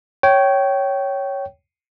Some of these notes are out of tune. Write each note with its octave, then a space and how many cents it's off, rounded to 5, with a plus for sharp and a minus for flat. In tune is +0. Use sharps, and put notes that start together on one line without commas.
C#5 +0 G5 -20